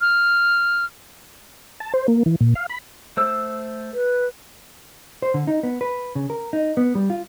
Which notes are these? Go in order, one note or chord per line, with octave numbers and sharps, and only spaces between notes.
F6
A5
C5
A#3
E3
A#2
F5
B5
A3 C5 E6
B4
C5
D3
D#4
B3
B4
C#3
A#4
D#4
B3
G3
F4